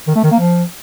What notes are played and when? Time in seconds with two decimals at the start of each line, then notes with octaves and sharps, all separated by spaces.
0.07 D#3
0.15 A3
0.23 D#3
0.31 A#3
0.39 F3